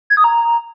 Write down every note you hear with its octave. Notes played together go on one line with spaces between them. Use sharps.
G#6
D#6
A#5